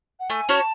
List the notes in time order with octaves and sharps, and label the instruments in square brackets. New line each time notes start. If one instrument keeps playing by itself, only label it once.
[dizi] F#5
[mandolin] A3 [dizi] G#5
[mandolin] C#4 F#4 C#5 [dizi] A5